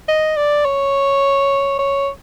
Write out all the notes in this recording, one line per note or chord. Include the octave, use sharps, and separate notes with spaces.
D#5
D5
C#5
C#5